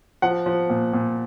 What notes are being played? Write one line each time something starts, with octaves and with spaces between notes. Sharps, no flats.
F3 F#5
F3
A#2
A#2